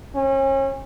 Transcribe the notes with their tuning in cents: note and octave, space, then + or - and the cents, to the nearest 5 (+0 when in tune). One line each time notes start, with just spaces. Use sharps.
C#4 -35